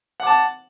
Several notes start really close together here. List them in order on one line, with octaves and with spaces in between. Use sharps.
F#5 D6 A5